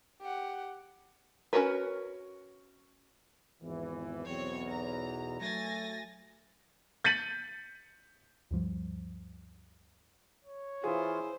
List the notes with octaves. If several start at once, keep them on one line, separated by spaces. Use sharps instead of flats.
G4 F#5
C#4 D4 F#4 A#4 B4
G#1 E2 E3
B1 E2 C4 C#5
A#5
F#3 A3 G#5 A6 A#6
G6 A6 B6 C#7 D#7 F#7
D2 G2 F3 G3
C#5
E3 E4 F4 G#4 C5